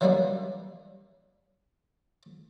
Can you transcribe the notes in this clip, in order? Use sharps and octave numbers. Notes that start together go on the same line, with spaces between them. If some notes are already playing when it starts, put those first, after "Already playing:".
E3 F#3 G3 A#3 D4 D#4